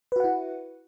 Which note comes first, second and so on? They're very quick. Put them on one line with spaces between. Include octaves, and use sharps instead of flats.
B4 F#4 F#5 E4